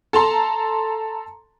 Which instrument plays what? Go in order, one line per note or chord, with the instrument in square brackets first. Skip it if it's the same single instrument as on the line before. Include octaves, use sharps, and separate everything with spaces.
[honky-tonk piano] A4 A5 A#5 C6